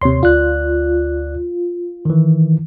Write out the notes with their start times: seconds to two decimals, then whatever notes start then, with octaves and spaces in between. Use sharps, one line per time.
0.01 D#2 C3 C#5 C6
0.23 D2 F4 D5 F#6
2.05 D#3 E3